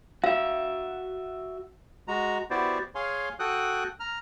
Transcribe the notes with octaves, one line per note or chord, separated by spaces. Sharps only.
F#4 E5 F5
G#3 F#4 A#5
B3 E4 F#4 G4 C5 D5
G#4 C#5 F5 G#5 C6
F#4 A4 G5 D#6 F#6
A#5 F6